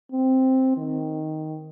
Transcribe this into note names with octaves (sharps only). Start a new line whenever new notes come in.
C4
D#3